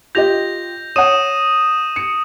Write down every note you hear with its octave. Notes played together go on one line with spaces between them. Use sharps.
F4 G4 D#5 G6 A#6 F7
C#5 F#5 D#6 D#7 E7
C#7